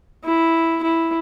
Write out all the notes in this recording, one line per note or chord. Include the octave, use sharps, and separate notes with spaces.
E4
E4